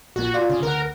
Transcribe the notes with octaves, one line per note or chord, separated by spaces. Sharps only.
A#1 A#2 F#4
F4 D5
C#3
D2 A#4 F#5